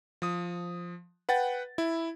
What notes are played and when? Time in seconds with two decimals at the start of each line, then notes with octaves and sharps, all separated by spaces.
0.22 F3 D#6
1.29 B4 F#5 G5 A6
1.78 E4